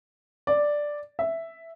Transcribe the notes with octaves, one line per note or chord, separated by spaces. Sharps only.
D5
E5